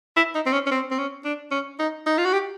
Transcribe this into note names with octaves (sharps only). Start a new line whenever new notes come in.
E4
D#4
C4
C#4
C#4
C4
C4
C#4
D4
C#4
D#4
D#4
F4
F#4
G4